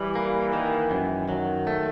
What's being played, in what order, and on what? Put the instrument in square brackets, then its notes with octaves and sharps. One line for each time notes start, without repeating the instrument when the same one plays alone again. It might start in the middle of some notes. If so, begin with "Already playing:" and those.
Already playing: [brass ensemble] E3 [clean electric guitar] G3
[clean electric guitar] A#3
D#3
F#2
[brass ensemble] D#3 [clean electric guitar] F#3
[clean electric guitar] A3